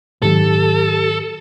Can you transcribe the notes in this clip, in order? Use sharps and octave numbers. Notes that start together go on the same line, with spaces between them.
G#2 D#3 F#3 G4 A4